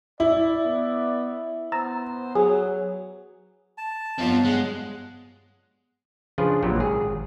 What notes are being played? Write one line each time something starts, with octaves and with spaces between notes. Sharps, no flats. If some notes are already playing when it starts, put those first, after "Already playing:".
E4 D5
B3
B3 C5 A#5 E6 A6
F#3 G#4
A5
G2 B2 F#3 C4 F4
G#3 F#5
C#3 F3 D4 F4 G#4 B4
A#1 A#2 F#3 C4 G4
G#1 G#4